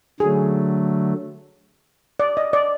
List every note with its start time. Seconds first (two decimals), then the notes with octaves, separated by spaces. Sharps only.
0.20 D3 F#3 A3 G#4
2.20 D5
2.37 D#5
2.53 D5